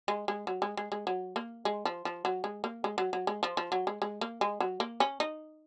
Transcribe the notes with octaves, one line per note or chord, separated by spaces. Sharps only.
G#3
G#3
F#3
G#3
G#3
G#3
F#3
A#3
G#3
F3
F3
F#3
G#3
A#3
G#3
F#3
F#3
G#3
F3
F3
F#3
G#3
G#3
A#3
G#3
F#3
A#3
C#4
D#4